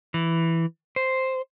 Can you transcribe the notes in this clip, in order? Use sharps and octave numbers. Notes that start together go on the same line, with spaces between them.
E3
C5